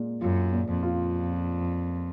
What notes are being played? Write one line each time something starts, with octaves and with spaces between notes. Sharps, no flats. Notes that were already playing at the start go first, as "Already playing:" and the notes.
Already playing: A#2 G#3
F#2 F4
A#2
F2
F4